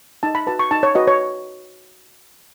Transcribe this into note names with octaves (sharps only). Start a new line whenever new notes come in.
D#4 A5
B5
F#4 B4 A5
C#6
D#4 A5
C#5
F#4 B4 D#5
C#5